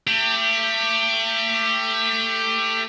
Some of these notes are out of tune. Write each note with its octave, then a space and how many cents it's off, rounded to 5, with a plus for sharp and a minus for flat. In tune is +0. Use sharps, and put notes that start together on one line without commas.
A3 +30 G4 +10